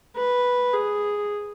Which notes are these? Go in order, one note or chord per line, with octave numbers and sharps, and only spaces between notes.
B4
G#4